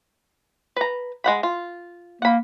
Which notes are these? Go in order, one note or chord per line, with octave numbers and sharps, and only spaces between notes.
B4 A#5
G#3 F#5 B5
F4
A#3 F#5 B5